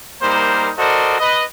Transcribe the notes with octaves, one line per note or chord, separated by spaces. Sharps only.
G3 A#3 D#4 A#4 C5
F#4 A4 A#4 C5 D5 D#5
B4 D#5